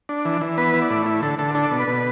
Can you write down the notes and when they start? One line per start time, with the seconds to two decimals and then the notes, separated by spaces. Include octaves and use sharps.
0.09 D4
0.25 E3
0.41 E3
0.58 B3 B4
0.74 E4
0.82 D5
0.90 A2
1.06 E4
1.22 D3 A4
1.39 D3 A4
1.55 D4 A4
1.71 B2
1.80 B4
1.88 B2